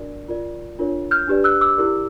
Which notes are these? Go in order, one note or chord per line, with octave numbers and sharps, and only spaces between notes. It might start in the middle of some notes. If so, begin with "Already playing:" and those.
Already playing: D4 F#4 A#4 D5
F4 A#4 D5
D4 F4 A#4 C#5
F6 G6
D4 G4 B4 D5
E6 F#6
D6 E6
E4 G4 A#4 D5